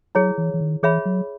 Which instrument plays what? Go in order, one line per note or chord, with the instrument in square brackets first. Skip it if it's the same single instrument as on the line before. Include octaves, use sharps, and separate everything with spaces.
[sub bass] F#3 [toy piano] E4 G#4 C#5
[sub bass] E3
E3
D#3
[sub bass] E3 [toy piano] G#4 C#5 E5 B5
[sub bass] F#3